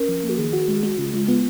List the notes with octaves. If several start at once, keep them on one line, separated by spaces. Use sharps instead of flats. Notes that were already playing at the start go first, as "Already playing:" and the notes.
Already playing: C#4 A#4
F3
A#3
F#4
D#3 G#4
F#4
G#3
G#3 F#4
C#3 F4
G#3 F4
B3 F4